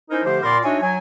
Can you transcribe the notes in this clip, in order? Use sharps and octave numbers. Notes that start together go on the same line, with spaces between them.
C#4 D#4 E4 A#4 C5
D3 F3 A3 G4 C5
A#2 B3 F4 A#4 D5 C6
D4 D#4 F#4 C#5 E5 G#5
F#3 G#5